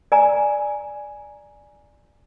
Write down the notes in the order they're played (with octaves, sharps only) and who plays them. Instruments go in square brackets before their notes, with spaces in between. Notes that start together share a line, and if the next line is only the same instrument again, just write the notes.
[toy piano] D5 G#5 A#5